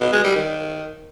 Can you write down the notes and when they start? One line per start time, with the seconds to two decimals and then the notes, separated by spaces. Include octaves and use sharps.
0.01 B2
0.12 G#3
0.24 G3
0.35 D#3